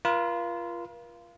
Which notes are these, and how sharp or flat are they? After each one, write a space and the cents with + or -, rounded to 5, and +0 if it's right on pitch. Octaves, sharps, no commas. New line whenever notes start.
F4 -20 A#4 +45